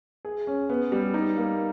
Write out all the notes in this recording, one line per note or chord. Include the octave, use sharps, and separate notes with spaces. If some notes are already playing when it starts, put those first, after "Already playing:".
G#4
C#4
B3
G3
D#4
A#3